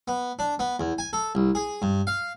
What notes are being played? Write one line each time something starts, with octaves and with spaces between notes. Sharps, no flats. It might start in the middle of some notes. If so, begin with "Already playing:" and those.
B3
D4
B3
E2
G#5
A4
C2
G#4
G2
F5